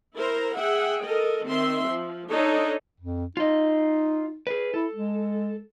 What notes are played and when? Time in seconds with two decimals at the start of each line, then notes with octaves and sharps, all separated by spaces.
0.15 E4 A#4 C5 A#5
0.57 G#4 E5 F#5 G5
1.04 A4 A#4 D#5
1.46 D#3 C4 E5 C6
1.91 F3
2.31 D4 D#4 A4 C#5 D#5
3.00 F2
3.37 D#4 F4 D#5
4.47 G#4 B4
4.74 E4 A4
4.95 G#3